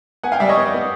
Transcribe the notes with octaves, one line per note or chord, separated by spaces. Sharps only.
B3 F#5 G#5
F5 G5
G3 D5 E5
C#5 D#5
B3
B3